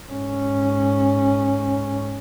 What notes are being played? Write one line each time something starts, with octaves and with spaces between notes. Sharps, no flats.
G#2 C#4